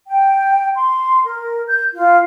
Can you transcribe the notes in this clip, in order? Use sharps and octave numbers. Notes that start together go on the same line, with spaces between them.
G5
C6
A#4
G6
F4